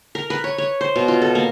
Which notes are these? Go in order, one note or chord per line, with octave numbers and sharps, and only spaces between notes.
A#4
B4
C#5
C#5
C5
B2
F4
A4
A#3